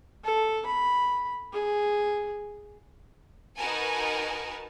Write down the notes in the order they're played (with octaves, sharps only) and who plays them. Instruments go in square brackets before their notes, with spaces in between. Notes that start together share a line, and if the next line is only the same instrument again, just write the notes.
[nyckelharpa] A4
B5
G#4
[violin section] D#4 F#4 A#4 B4 G#5 A5